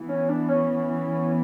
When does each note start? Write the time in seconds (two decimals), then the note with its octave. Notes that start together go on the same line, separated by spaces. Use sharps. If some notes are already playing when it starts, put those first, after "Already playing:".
Already playing: E3 B3
0.09 C#4
0.29 D4
0.49 C#4